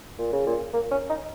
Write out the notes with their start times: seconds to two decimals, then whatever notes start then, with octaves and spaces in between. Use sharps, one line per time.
0.19 A#2
0.33 C#3
0.46 A#2
0.74 A#3
0.91 C#4
1.09 D#4